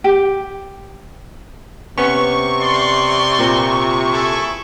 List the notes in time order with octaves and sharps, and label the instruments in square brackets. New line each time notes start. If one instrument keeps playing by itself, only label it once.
[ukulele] G4
[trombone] C3 [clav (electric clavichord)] B3 C#4 [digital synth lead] C#6
[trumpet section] D5 C6
[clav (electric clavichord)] A#2 C4
[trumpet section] E4 G#4 A4